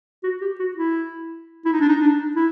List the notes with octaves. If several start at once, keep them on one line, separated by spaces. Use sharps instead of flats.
F#4
G4
F#4
E4
E4
D#4
D4
D#4
D4
E4